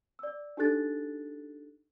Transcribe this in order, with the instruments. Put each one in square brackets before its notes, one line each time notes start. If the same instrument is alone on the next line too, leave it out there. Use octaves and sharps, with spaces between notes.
[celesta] D5 E6
D4 D#4 G4 A4 F#6 A6